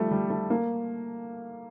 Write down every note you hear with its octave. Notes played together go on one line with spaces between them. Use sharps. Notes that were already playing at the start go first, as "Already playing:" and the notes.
Already playing: F3 G3 A3
G3
A3
A#3